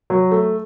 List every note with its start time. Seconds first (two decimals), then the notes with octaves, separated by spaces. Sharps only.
0.10 F#3
0.31 A3